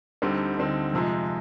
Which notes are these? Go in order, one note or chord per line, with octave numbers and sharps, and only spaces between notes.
D2 D3 G3 C4 D#4
D2 D3 G3 C4 D#4
F2 C3 F3 G#3